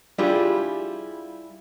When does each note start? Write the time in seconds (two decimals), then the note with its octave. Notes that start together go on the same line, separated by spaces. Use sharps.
0.18 G3 D4 E4 F4 G4 G#4